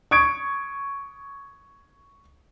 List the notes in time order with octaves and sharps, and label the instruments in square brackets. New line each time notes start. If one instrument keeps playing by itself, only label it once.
[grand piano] C#6 D#6 G#6 D7